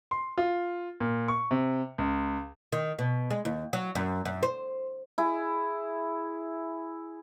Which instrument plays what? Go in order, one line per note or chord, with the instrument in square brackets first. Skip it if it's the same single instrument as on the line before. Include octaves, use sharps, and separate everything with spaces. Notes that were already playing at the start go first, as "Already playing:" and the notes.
[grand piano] C6
F4
A#2
C#6
C3
C#2
[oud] D#3
B2
G#3
D#2
F#3
F#2
F#2
C5
[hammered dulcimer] E4 G#4